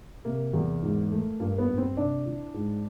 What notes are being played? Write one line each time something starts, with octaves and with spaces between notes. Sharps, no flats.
C3 A#3
E2
G#2
A3
G2 A#3
B3
G2
C4
C3 D4
E3
G#2